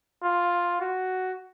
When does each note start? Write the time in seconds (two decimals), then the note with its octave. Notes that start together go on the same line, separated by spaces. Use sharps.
0.23 F4
0.81 F#4